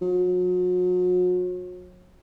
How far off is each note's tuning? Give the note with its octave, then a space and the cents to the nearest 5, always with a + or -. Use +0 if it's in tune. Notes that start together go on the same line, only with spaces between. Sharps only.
F#3 -40